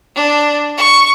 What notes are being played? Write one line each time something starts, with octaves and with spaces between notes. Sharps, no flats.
D4
C#6